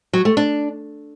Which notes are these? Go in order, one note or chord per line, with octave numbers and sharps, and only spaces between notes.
F#3
A3
D4